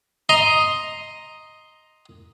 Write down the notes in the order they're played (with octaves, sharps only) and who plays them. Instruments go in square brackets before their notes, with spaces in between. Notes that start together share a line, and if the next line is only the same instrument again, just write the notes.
[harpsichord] D#5 A#5 C6